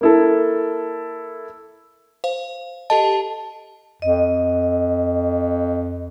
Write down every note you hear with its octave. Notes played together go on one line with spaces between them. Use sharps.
A#3 E4 A4
C5 F5
G4 A4 D#5 A5
F2 D#5